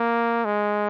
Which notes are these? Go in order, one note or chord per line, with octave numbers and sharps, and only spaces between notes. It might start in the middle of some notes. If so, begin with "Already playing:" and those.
Already playing: A#3
G#3